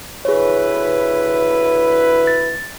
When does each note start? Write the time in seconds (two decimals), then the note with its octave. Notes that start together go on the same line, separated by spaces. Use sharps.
0.25 D2 E4 G#4 B4 C#5
2.27 A6